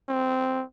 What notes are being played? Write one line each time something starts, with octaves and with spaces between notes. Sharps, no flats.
C4